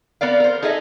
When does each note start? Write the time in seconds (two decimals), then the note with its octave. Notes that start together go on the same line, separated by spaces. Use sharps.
0.21 B3 A#4 D5 F5
0.40 A#4 C5
0.62 D#4 G#4 A4 D#5 E5